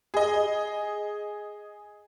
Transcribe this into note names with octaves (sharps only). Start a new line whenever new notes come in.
G#4 D#5